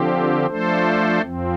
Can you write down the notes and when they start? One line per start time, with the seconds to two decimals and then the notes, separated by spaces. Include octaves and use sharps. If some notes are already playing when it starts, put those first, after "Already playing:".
Already playing: D3 F3 C4 G4
0.46 F3 A3 D4 A4 C5
1.21 F2 F3 C4